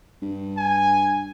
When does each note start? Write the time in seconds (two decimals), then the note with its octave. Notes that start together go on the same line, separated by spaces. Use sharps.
0.22 G2
0.57 G#5